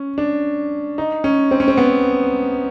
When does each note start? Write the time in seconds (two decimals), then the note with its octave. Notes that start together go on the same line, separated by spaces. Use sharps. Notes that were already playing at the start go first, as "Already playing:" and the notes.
Already playing: C#4
0.18 D4
0.98 D#4
1.24 C#4
1.51 C4
1.60 C#4
1.68 C4
1.77 B3